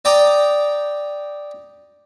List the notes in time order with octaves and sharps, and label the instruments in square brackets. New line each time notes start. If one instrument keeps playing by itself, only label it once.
[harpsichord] D5 G5 A#5 D6 D#6